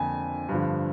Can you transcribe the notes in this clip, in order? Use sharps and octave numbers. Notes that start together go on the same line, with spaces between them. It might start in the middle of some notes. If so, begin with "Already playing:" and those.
Already playing: F2 D3 A#3 G#5
G2 D3 F3